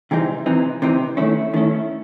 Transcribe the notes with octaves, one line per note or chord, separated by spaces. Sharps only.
C3 E3 G#3 C4 D#4
C3 E3 C4 D#4
C3 E3 C4 D#4
D#3 A3 C#4 E4
D#3 A3 C#4 E4